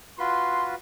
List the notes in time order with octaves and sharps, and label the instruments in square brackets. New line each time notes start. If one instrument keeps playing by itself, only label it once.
[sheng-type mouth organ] F4 F#4 B4 [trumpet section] C6